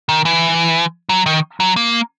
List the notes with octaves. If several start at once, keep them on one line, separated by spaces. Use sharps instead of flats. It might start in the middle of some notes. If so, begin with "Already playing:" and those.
D#3
E3
F#3
D#3
F#3
A#3